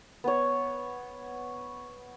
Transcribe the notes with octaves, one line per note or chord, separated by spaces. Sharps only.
B3 C#5